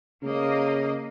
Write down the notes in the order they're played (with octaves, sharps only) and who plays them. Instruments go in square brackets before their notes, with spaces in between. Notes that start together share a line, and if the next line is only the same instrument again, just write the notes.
[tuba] C#3 [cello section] A#3 D#5